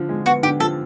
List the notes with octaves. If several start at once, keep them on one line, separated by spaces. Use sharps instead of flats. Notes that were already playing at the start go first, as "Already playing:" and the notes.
Already playing: D3 F3
G#3
B3 F#4
D3 G4
F3 A4